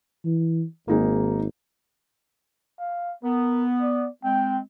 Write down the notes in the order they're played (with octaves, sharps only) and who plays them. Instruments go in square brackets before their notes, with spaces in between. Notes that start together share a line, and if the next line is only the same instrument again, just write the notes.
[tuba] E3
[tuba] G#1 [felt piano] A#3 D#4 G#4
[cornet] F5
[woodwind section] B3 [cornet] A#4
[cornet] D5
[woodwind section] G#3 C4 [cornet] G5